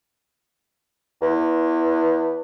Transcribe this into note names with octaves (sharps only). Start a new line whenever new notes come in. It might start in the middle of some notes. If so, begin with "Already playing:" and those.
E2